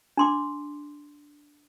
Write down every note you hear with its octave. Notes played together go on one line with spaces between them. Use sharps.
D4 C6 D6